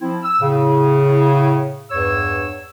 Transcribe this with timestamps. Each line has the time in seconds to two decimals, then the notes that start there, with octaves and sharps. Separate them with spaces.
0.01 F3 C4 E4
0.23 E6
0.40 A2 C#3
1.91 E2 G2 C#5 E6